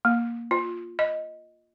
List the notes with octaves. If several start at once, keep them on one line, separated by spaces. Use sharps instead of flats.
A#3
F4
D#5